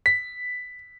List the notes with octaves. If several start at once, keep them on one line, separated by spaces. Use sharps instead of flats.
B6